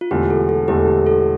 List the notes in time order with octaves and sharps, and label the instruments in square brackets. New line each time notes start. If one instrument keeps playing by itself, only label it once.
[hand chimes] F4
[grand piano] E1 E2 D3 A3 [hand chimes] G4
[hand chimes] A4
A4
[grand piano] E1 E2 D3 A3 [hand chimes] G4
[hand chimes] G4
A4